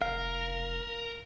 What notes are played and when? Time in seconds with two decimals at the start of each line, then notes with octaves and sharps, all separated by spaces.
0.02 F1 A#4 F5